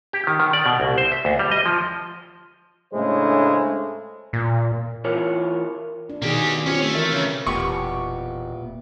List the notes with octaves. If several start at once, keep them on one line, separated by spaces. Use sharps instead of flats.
G4
D#3
D#3
D5
B2
C2
C5
E5
D2
G3
D#5
F3
A2 C#3 G#3 A3 D4 C5
A#2
E3 F4 A#4 C#5
D4
B2 D#3 A#3 G4 G#4
C4 C#4 F4 G4 C#5
A3
E3 A#4 E5
C#3
E1 A#2 B3 G4 C#6